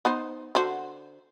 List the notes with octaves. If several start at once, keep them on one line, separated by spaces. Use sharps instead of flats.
B3 D#4 C5
D3 F#4 C5